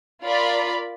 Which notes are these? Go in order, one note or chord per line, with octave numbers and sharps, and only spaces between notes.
F4 A#4 D5 B5